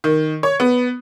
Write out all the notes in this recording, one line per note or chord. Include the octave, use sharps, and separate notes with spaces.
D#3
C#5
B3